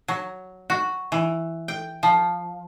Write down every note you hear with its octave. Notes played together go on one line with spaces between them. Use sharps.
F#3
F#4
E3
G5
F3